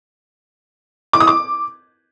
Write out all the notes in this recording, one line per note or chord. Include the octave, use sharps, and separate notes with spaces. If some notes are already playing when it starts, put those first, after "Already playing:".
D6
D#6
D6